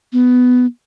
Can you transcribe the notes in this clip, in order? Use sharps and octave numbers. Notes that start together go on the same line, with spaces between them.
B3